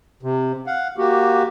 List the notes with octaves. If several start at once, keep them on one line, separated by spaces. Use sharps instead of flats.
C3
F5 F#5
A#3 F#4 G4